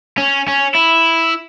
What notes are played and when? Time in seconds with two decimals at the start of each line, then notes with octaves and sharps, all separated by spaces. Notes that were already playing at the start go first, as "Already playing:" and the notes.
0.18 C#4
0.48 C#4
0.74 E4